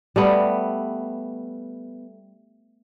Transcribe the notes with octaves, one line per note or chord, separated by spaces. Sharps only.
G3 A3 B3